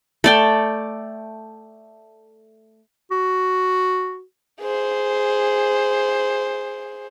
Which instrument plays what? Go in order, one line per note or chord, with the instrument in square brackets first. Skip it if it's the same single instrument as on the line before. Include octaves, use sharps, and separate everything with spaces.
[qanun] A3 D5 G5
[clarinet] F#4
[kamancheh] G#4 C5